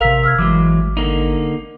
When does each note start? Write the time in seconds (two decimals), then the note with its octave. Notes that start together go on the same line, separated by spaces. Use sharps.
0.01 A1 C3 A#4 F5 E6 B6
0.23 E6 F6 G#6
0.38 G#1 E3 F#3 G#3 D6
0.97 D3 A#3 D#4